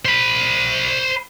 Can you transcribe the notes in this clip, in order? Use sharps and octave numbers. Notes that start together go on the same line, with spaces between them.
C5 B5